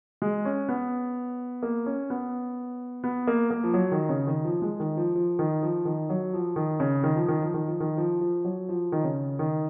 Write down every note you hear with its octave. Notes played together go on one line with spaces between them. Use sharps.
G#3
C#4
B3
A#3
C#4
B3
B3
A#3
A#3
F3
F#3
D#3
C#3
D#3
F3
G#3
D#3
F3
F3
D#3
F3
D#3
F#3
F3
D#3
C#3
D#3
F3
D#3
F3
D#3
F3
D#3
F3
F3
F#3
F3
D#3
C#3
D#3